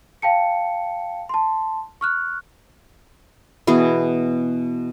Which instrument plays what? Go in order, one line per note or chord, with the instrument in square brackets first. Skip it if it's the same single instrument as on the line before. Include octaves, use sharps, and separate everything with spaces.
[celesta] F5 G5 A5 C#7
A5 C6
C#6 F6 F#6
[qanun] B2 E3 B3 G#4